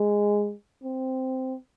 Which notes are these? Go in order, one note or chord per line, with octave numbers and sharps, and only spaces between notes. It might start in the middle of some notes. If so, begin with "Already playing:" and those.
Already playing: G#3
C4